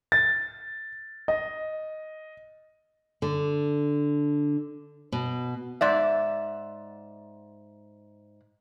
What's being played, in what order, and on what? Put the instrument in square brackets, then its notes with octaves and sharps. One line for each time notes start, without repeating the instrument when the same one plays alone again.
[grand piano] A6
D#5
[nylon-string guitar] D3
B2
[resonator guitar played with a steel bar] G#2 D5 E5